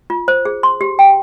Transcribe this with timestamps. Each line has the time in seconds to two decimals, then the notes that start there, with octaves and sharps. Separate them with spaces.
0.10 F4
0.28 C5
0.45 G#4
0.63 C6
0.81 G4
0.99 G5